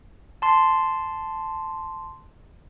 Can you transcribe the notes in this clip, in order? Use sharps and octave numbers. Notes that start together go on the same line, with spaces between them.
A5 C6